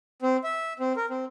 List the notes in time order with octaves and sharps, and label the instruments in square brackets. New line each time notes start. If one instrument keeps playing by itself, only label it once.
[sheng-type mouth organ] C4
E5
C4
A#4
C4